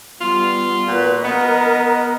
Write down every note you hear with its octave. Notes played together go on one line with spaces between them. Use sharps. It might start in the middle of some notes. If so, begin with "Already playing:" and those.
G3 B3 F4
A#2 F#4 B4
B3 A#4 D#5